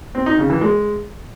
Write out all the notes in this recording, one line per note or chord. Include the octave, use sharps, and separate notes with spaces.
C4
D#4
C#3
E3
G#3